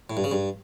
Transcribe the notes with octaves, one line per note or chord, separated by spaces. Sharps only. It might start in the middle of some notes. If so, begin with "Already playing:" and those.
A2
G2
C#3
G2